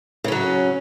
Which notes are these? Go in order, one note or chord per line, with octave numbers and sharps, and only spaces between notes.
C#3 F#3 C#4